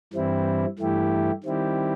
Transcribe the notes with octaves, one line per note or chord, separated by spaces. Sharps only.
G2 E3 G3 C4 E4
G2 E3 A3 E4 G4
D#3 G3 C4 E4 G4